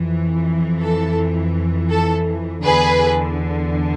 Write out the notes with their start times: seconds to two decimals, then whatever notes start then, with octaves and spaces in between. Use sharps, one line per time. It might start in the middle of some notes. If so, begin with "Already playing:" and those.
Already playing: F2 E3
0.81 A4
1.90 A4
2.64 E2 D3 G#4 B4